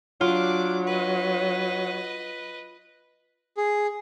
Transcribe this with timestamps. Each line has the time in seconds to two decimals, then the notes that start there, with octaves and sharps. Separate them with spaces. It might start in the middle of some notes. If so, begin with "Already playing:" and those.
0.21 F#3 D4 F4 D6
0.87 B4 D#5
3.57 G#4